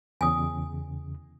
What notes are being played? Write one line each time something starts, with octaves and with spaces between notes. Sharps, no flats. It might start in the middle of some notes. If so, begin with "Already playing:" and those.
E2 C#3 G#5 D#6